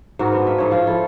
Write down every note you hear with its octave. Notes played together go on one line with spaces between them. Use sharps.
G#2 F#4 A#4
B3 D4
A#3 E5
G#2 F3 C#5
F3 F4
E4 A4